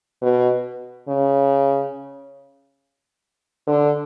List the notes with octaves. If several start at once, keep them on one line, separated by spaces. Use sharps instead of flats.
B2
C#3
D3